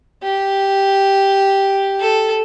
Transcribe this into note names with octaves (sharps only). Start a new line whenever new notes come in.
G4
A4